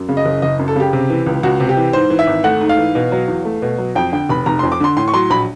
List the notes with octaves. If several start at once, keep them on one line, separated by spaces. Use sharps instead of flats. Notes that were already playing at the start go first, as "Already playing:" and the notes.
Already playing: F#2
C#3
D#5
F#1
F#1 D#5
F#2
A4
C#3 G4
C3
E3
C#2
C#2 F#4
C3
G4
E3
G#2 C5
E3
E5
G#1
A3 F#5
G#2
F5
E3
B2
F#3
E2
A3
B2
F#3
F2 G5
D3 G5
F1 B5
F1 A#5
F2 C6
D6
D3 C6
A2 C6
C#6
F#3 C6
A#1 B5